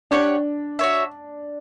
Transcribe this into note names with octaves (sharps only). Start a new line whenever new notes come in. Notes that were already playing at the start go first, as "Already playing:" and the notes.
D4 G4 C#5 F#5
F#4 C#5 E5